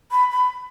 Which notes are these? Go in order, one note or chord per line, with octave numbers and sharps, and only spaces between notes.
B5
B5